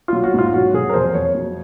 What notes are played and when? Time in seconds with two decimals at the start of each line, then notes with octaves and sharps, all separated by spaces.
0.08 F#3 F4
0.24 F#4
0.34 G#2 F4
0.54 F#3 F#4
0.74 F#3 G#4
0.89 A#4
0.94 F2 C5
1.14 F2 C#5
1.35 F#3